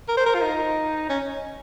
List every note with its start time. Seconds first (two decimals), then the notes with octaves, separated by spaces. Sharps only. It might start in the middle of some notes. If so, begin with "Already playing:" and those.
0.09 A#4
0.17 C5
0.26 A#4
0.34 F4
0.42 D#4
1.09 C#4